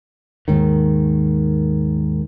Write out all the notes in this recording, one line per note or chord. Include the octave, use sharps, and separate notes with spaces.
D#2 G#2 D#3